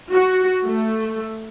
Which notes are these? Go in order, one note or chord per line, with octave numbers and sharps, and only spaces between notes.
F#4
A3